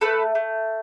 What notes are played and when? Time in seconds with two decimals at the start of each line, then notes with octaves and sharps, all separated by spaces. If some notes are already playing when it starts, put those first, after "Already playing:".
0.01 A3 A4 B4
0.35 A3